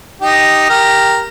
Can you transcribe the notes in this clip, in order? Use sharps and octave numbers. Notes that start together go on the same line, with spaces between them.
D#4 G4
G4 A#4